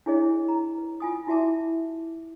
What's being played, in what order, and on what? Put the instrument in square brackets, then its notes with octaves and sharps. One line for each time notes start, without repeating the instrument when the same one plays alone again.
[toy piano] D4 E4 G#4 C#5 D#5
A#5
B4
F4 G#5 D#6
E4 F#4 E5 A5 D6